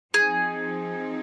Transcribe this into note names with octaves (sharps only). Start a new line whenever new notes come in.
F3 C4 D#4 G#4